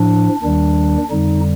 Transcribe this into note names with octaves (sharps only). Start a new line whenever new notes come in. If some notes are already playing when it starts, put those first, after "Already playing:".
Already playing: A2 F3 D4
D#2 D#3 G3 D4
F2 D3 G3 D#4